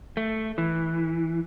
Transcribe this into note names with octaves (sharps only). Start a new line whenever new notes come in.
A3
E3